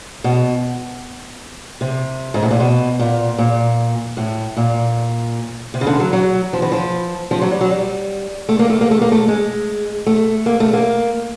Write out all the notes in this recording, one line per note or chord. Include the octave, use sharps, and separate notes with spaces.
B2
C3
G#2
A2
A#2
B2
A#2
A#2
A2
A#2
C3
C#3
D3
F#3
F#3
F3
E3
F3
F3
F#3
G3
F#3
G3
A3
A#3
A3
A#3
A3
A#3
A3
G#3
A3
A#3
A3
A#3